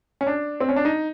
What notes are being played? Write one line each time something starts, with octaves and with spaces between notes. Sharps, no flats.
C#4
D4
C4
C#4
D4
D#4